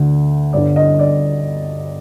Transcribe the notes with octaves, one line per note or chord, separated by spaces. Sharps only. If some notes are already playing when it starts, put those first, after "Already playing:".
Already playing: D2 D3
G1 G2 D3 D5
D#5
D5